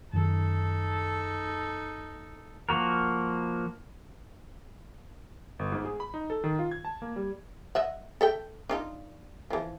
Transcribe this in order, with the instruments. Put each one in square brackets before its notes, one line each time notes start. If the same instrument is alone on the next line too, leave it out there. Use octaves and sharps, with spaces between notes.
[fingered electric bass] F#2 D#3 C#4 [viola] D#4 A4
[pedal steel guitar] F3 A#3 F#4 A#4
[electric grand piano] G1
G#2
G#4
B5
D#4
A4
D#3
F4
G#6
A5
A#3
G3
[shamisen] D#5 E5 F#5
A4 E5 G5
D4 D#4 F4
E3 F3